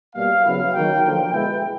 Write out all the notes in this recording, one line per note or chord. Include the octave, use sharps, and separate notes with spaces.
B2 G3 A#3 F5
C#3 F#3 B3 E4 F5
D#3 F#3 A#3 G5
D3 F3 A#3 G5
B2 G#3 B3 E4 G5